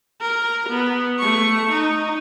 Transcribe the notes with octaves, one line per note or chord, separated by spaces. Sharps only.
A#4
B3
A3 C#6
D#4